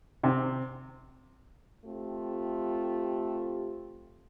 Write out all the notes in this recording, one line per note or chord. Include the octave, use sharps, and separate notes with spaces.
C3
A3 C4 F4 G4